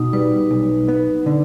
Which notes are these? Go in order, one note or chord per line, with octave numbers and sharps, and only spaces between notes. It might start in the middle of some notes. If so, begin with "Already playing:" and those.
Already playing: B2 D#4
G3 B4
B1
B3
D3